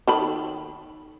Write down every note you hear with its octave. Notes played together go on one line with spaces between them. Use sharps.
D#3 A4 B5